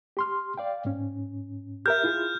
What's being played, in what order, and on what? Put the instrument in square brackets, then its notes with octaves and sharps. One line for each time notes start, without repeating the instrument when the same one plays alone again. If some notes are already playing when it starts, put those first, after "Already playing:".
[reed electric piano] G4 C6 F6
D5 F5 G5
G#2 C#4
[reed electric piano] G4 A#4 E5 [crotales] F6 G6
[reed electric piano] E4 F4 G#4